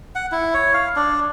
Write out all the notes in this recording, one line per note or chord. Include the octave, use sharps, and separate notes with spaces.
F#5
E4
C#5
F5
D4